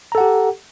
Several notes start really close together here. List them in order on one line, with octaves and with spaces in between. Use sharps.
A#5 A4 F#5 G4